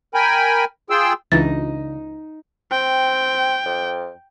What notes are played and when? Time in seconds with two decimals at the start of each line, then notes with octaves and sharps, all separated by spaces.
0.14 A#4 G5 G#5 B5
0.90 F4 G#4 G5 C6 E6
1.32 C#2 C#3 E3 D4 D#4 F4 A6
2.72 C4 G5
3.66 F2